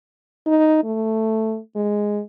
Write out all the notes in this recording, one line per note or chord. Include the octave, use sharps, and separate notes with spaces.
D#4
A3
G#3